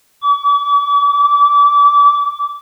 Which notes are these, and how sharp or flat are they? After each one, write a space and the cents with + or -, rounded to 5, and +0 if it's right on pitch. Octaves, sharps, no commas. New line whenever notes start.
D6 -45
D6 -25